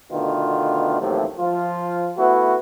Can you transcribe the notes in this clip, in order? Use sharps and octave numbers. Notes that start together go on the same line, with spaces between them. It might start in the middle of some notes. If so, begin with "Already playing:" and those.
B2 D3 D#3 A3 B3 F4
A1 D#2 A2 C3 F3 F#3
F3 F4
A3 B3 E4 F#4